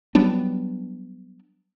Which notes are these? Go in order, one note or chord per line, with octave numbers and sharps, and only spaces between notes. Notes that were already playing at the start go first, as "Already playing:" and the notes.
F#3 G3 B3 D4